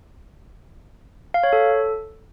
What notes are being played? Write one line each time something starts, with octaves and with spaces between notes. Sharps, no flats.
F5
C#5
A4